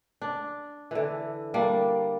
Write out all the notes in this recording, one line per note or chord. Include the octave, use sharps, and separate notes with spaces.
D4
D3 E3
G3 A#3 D4